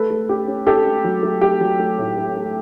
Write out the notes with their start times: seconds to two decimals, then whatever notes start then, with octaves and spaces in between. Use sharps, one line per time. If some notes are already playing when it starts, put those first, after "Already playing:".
Already playing: A3 A4 B4
0.10 A3
0.29 C#4 G4
0.48 C#4
0.67 C#4 G4 A4
0.85 A3
1.04 F#3
1.23 A3
1.41 A3 G4
1.61 F#3
1.80 A3
1.99 A2
2.18 A3
2.36 A3